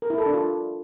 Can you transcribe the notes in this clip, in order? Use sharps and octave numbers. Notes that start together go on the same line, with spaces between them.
A#4
E4
A4
D4
F4